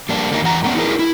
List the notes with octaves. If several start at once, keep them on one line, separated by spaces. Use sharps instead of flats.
G3 A#3 D4
D3 A#3 D#4
E2 E3 F#5 A#5
A2 A3 B3 C#4 D4
D#4 E4 G#4 A#4 B4
E4